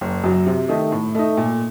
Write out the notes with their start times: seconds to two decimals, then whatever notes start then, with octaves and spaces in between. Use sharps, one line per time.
0.01 F#1
0.24 F#2 F#3
0.46 C3
0.69 D#3 A3 D#4
0.92 A2
1.15 A3 D#4
1.37 A#2